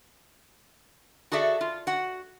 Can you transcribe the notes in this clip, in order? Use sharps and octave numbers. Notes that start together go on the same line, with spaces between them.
F#4 G#4 A4 D5 E5
F4
F#4 F#5